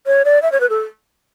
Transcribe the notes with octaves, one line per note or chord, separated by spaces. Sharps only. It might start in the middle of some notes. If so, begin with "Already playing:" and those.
C#5
D5
E5
C#5
B4
A4